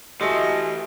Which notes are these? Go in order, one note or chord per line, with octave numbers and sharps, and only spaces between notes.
E3 A3 F#4 G4 A4 D#5 G#5 C6